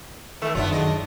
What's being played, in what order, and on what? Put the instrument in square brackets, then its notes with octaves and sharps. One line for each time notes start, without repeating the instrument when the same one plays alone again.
[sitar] D#3 E3 [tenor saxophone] A3
[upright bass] F#2 D#3 [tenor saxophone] F#3 [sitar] B3 D4 F4
[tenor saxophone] G#3 [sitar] D4 D#5